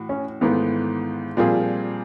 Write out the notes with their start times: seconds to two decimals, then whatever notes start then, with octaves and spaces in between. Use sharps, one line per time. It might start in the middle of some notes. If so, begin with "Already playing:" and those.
Already playing: A2 E3 F#4
0.09 C#4
0.41 G#1 G#2 E3 A3 B3
1.37 A#2 F3 G3 C4 F4 G#4